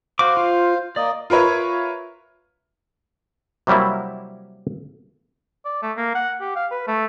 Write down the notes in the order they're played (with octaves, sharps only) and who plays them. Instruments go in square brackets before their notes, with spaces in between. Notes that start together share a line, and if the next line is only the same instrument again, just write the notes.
[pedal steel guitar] F#4 D6 [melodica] C5 F5
[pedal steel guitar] F4
[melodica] A#3 D#5 [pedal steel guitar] D5
[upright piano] F4 A#4 B4 C#5 E5
[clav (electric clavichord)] C3 F#3 G3 A#3 E4
[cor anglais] D5
A3
A#3
F#5
G4
F5
B4
A3